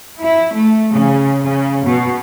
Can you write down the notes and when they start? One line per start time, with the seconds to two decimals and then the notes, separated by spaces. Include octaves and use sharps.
0.20 E4
0.52 A3
0.92 C#3
1.45 C#3
1.84 B2